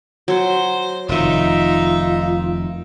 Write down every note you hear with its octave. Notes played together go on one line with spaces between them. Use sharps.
F#3 C5
F1 D#3 D#4 F4 E5